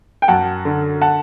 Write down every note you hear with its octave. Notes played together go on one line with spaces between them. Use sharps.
G5
F#2 F#5 A5
D3
F#5 A5